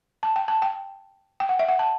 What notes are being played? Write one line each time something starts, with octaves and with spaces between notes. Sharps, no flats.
A5
G5
A5
G5
G5
F#5
E5
F#5
A5